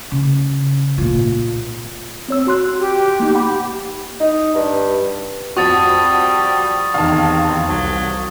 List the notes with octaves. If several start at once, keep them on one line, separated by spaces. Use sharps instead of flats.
C#3
A#2 F4
C4 C#5 E6
F#4 C6 F#6
G4
A#3 D#4
F#5 B5
D#4
G2
F2 G3 F#4 C#6 D#6 A6
E2 C3 D#3 F5 A5
C2 F#3